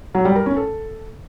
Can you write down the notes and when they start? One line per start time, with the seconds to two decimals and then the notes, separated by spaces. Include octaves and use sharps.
0.14 F#3
0.25 G3
0.36 A#4
0.46 C#4
0.57 A4